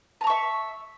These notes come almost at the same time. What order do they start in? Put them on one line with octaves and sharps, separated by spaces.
A5 A#5 C#6 E5